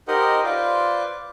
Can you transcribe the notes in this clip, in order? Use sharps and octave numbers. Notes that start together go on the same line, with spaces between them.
D#4 G4 A#4 C5 D#5 F#5
F4 B4 C5 D5